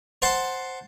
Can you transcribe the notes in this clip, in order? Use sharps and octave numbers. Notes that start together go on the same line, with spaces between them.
C5 F#5 A5 C6